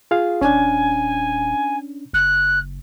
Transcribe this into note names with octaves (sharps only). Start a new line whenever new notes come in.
F4 G#4 F5
D#1 C#4 D4 G#5
F#1 F#6